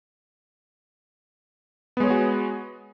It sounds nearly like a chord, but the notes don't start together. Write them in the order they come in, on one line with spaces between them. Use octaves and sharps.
B3 G#3 C#5 G#4 F#4